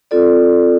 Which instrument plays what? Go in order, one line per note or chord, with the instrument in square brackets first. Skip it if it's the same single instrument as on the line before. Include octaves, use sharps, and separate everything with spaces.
[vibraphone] C4 F4 A4 D5